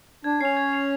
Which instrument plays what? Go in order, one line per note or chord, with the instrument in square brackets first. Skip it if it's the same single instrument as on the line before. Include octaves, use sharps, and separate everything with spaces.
[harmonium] D4 [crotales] G#6
[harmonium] C#4 [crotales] C7 F7
[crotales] G#6
C7 F7